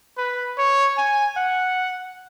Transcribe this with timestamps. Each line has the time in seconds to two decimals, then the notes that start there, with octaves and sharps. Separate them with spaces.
0.18 B4
0.58 C#5
0.97 G#5
1.37 F#5